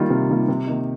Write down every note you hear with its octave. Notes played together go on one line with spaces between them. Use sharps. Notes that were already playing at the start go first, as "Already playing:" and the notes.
Already playing: D#3 G3 A#3 F4
C3
D#3 G3 A#3 F4
C3
D#3 A#3 D#4